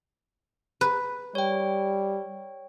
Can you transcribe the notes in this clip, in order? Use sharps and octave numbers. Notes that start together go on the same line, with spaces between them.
B4
G3 C#5 G5